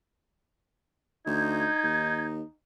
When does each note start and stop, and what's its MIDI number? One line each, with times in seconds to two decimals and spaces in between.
1.26 1.68 38
1.26 2.53 63
1.26 2.24 91
1.26 2.24 92
1.84 2.42 39